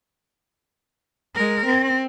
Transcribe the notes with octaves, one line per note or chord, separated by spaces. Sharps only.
G#3 A#4
C4